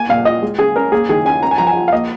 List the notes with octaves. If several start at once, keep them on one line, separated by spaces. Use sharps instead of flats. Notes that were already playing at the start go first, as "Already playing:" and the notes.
Already playing: A#3 G#5
A#2 F5
F4 D#5
G#3
C#3 G#4
C#4 A#4
A#3 G#4
D#3 G#4
C#4 G#5
C#4 A#5
G#5
F3 A#5
G#5
F4
F5
A#3 D#5